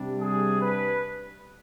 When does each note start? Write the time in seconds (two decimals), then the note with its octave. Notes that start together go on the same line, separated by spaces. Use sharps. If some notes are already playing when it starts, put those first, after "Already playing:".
Already playing: C3 G3 D4
0.19 G#4
0.60 B4